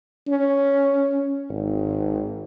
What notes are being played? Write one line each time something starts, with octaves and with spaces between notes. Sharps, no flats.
C#4
G#1